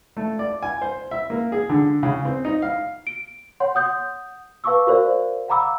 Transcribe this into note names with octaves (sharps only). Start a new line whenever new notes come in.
A3
D5
G#5
C5
E5
A#3
G#4
D3
C#3
C4
D#4
F5
D7
C#5 F#5 C6
F#5 D#6 G6
B4 F5 A5 C#6 D6 E6
F#4 A#4 C5 D5 F5
F5 F#5 A#5 B5 D6 E6